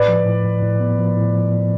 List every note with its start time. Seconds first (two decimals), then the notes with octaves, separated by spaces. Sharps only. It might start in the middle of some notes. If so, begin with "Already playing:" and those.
Already playing: A2 B4 D5
0.08 F3
0.26 A2
0.44 A2
0.62 A2
0.80 B3
0.99 F3
1.16 A2
1.34 F3
1.53 F3